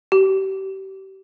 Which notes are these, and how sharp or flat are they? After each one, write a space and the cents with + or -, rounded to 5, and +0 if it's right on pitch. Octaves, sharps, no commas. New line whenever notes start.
G4 -30